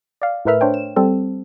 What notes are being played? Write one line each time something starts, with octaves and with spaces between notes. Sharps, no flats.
D5 F5
A2 A3 A#4 B4 E5 F6
D4 C5 C#5 G5
E7
G3 C4 A4